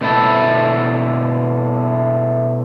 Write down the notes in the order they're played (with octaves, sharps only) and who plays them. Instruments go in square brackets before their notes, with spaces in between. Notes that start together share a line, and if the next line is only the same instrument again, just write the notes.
[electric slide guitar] B2 A3 E4 A4